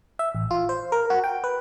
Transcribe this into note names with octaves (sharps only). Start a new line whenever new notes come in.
E5
A1
F4
C5
A#4
F#4
G5
B4